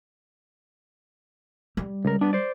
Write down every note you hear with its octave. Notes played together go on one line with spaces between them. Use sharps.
G3
C#2 A#4
B3 D4
C5 D5